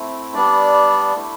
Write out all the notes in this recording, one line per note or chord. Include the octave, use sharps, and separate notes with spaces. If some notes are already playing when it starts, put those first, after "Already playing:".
Already playing: A3 C4 E4
G3 B3 D4 D5
A3 E4